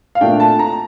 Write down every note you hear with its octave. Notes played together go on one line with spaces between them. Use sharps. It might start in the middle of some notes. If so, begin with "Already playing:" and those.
F5
A#2 A3 D4 G5
A5
A#5